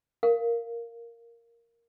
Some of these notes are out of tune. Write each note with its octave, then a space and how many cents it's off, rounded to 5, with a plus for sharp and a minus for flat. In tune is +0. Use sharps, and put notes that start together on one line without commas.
A#4 +0 F5 -5